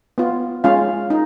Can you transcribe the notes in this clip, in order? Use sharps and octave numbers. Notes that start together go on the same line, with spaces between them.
B3 F4
G#3 C#4 F4 F5
D#4